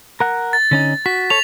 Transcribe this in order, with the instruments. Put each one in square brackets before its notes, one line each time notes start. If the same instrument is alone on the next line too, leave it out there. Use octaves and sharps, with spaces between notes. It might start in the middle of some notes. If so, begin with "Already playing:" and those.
[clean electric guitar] A#4 F#5
[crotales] A6
[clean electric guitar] D3 C#4 D#4
[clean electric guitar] F#4 [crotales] B6
[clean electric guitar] A4 C#5 [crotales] F7